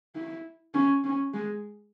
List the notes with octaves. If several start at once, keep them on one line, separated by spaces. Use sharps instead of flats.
E4
C#4
C#4
G#3